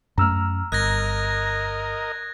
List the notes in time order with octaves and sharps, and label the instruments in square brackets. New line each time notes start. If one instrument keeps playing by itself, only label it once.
[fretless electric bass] F#2 A3 [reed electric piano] A#5 E6 F6
[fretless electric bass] G1 [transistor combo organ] A#4 D#5 [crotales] F#6 G#6 A#6